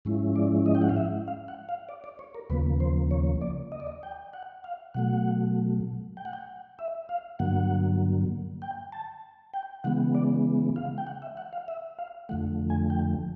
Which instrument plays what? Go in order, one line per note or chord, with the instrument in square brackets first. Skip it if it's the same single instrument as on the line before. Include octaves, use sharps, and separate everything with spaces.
[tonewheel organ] G#2 F3 G#3 C#4 E4
D5
D#5
G5
F#5
F5
E5
F5
F#5
F5
D5
D5
C#5
A#4
D#2 C#3 F3 A#3 B4
C5
C#5
D5
D#5
D5
D#5
G5
F#5
F5
B2 F#3 A3 F#5
G5
F#5
G5
E5
F5
G2 D3 F#3 A#3 F#5
G5
A5
G5
C#3 E3 G#3 B3 F#5
D5
F5
G5
F#5
E5
F#5
F5
E5
F5
F2 D3 F3 A3 F#5
G#5
G5